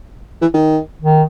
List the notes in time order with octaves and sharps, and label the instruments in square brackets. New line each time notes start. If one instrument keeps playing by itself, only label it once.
[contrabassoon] E3
D#3
[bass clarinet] D#3